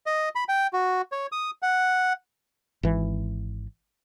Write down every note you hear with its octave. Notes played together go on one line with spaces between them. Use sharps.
D#5
B5
G5
F#4
C#5
D#6
F#5
G#1 E3